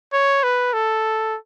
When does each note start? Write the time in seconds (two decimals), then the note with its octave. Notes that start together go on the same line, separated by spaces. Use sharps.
0.13 C#5
0.43 B4
0.73 A4